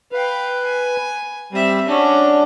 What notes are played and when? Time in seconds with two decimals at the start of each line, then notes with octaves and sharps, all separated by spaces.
0.12 B4 F5 G5
0.65 G#5
1.53 G3 C4 E5
1.88 C#4 D4 F#4